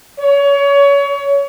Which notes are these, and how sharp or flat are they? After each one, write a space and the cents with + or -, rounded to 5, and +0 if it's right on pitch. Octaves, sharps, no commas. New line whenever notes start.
C#5 +25